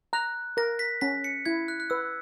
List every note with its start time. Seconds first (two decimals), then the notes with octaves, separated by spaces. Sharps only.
0.13 A#5 F#6
0.57 A#4 A#6
0.79 B6
1.01 C#4 B6
1.24 C#7
1.46 E4 G#6
1.68 F#6
1.80 F#6
1.90 B4 E6